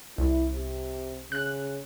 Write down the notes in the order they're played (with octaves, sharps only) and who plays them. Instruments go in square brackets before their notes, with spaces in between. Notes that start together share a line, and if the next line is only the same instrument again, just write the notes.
[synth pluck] C2 [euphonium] E4
[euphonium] C3
[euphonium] C#3 [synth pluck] F#6